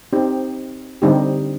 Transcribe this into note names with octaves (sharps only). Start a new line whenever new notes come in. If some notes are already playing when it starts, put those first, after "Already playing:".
C4 D#4 G4
D3 G3 C4 D#4 G4